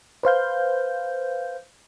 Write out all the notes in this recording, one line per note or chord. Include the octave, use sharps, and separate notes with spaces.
B4 C5 F5 G6